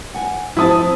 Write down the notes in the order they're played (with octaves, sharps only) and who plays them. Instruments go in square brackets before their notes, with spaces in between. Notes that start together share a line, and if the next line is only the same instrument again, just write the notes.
[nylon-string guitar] F#5 G#5
[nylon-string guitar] F3 C4 A5 [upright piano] E4 D#6